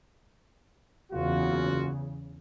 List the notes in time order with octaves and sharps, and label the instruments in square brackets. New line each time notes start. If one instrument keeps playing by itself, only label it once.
[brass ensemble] F#1 F4 F#4 [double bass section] E2 C#3